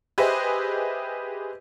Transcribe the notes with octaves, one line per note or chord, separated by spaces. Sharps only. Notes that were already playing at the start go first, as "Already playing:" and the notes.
G4 G#4 B4 C5 D#5 E5